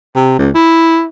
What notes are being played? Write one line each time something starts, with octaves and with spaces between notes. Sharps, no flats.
C3
C#2
E4